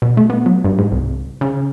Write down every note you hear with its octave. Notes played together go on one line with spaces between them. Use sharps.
B2
A3
B3
F#3
G2
G#2
C2
C#3